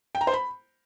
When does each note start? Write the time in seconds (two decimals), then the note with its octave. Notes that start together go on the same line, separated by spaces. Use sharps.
0.15 G5
0.21 A#5
0.27 C5
0.34 B5